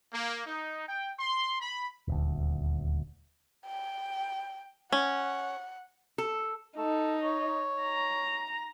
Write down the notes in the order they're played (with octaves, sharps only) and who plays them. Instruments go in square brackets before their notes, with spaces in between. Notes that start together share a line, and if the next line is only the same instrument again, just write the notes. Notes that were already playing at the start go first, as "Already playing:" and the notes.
[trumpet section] A#3
D#4
G5
C6
B5
[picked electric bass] D#1 D2
[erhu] G5
[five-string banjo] C#4 [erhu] F#5
[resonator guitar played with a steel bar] A4
[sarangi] D#4 [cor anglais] A4
[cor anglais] C#5
[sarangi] A#5